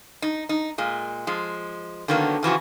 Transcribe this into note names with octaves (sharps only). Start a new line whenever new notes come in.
D#4
D#4
A#2 G#3
F3 G#3
D3 D#3 F#3 A#3 B3
C#3 E3 F3 F#4